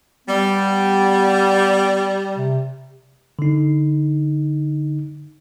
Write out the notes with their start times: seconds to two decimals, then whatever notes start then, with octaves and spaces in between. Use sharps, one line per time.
0.27 G3 B3
2.37 C3
3.39 D3 D#4